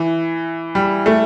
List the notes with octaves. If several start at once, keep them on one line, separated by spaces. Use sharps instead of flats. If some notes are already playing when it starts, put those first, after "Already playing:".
Already playing: E3
G3
A3